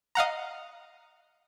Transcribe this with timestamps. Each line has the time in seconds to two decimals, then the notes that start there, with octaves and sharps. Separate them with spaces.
0.15 D#5 F5 F#5 A#5